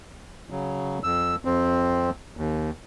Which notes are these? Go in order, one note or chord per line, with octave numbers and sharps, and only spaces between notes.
C#3 F#3
F2 E6
F2 C4
D#2